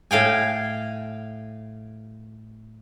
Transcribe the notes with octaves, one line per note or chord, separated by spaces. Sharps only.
A2 F5 G5 G#5